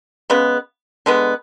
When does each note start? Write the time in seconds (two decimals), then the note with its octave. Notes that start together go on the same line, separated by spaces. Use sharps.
0.30 C#3 G#3 B3
1.06 D3 G#3 B3